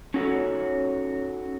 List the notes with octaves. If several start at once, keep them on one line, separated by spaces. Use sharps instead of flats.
C#4 D#4 F#4 A4 C#5